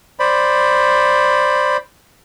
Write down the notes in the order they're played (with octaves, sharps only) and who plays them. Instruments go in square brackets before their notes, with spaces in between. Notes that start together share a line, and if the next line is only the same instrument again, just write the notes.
[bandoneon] C5 D5 B5